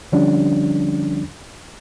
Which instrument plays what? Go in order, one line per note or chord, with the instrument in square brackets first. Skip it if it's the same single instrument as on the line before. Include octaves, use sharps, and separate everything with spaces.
[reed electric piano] D3 F3 G3 C#4 D4